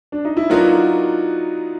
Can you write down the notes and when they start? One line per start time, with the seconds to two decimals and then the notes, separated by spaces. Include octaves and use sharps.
0.12 D4
0.25 D#4
0.37 E4
0.50 F#3 B3 D4 D#4 F4 F#4 A#4